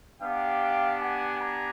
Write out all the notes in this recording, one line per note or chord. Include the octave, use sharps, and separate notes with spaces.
B3 D4 G4 F5 G5
F#5 G#5
G#5 A#5